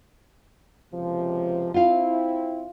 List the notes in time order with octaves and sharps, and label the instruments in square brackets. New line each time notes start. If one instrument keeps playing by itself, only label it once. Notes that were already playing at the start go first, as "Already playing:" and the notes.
[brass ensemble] C#2 C3 F3
[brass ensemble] C4 E4 [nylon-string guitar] F4 F5